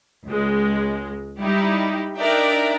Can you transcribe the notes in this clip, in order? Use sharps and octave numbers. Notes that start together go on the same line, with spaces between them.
C#2 G#3
G3 D#4 E4 G4
D4 D#4 A#4 D5 E5 G5